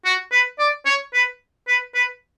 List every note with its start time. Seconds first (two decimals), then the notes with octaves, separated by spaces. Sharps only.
0.05 F#4
0.32 B4
0.59 D5
0.86 C#5
1.13 B4
1.67 B4
1.94 B4